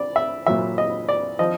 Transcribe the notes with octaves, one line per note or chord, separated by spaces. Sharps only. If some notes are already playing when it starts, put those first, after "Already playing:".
Already playing: D5
E5
A#2 F#3 E5
D#5
D5
F3 D#5